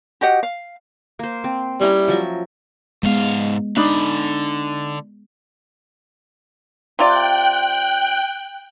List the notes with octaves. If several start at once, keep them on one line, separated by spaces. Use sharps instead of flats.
F#4 G4 D#5 F#5
F5
A#3 C5
C4
G3 C#4 E4 A#5
F3 F#3 E5
G#2 G#3 B3 F5
D3 D4 D#4 B5
C3 F4 D5 G5 F#6